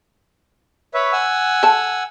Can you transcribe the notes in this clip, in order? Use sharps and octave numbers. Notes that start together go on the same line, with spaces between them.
B4 C#5 E5
F#5 G#5 E6
A4 A5